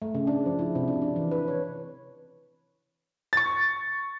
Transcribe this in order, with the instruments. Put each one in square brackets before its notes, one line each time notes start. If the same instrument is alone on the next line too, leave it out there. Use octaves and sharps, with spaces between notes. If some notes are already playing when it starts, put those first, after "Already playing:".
[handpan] A3
C#3
D4
F3
E4
C3
D4
D4
E3
B4
C#5
[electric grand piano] C#6 A6